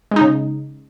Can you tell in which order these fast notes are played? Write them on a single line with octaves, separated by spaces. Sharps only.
G#3 D#4 C#3